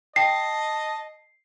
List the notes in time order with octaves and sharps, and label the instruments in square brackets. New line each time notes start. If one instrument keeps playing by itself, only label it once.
[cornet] D#5 [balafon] G5 [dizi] A5 [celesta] C7